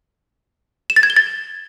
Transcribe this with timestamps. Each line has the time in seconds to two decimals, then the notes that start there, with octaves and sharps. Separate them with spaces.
0.90 E7
0.96 A6
1.03 G#6
1.10 G7
1.16 A6